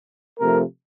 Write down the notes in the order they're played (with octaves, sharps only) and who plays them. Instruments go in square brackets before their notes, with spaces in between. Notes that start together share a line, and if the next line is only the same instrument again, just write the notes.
[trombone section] C3 F3 A3 A#4